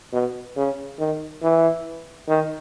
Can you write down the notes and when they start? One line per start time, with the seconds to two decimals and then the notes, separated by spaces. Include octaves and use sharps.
0.13 B2
0.57 C#3
0.99 D#3
1.42 E3
2.28 D#3